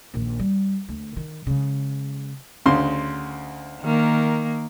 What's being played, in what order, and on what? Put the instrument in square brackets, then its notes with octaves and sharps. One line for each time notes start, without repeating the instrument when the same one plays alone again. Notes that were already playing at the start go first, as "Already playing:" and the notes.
[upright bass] A#1 D#2
G3
D2
D#3
C#3 G#3
[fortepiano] D2 C#3 C6
[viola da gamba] D#3 A#3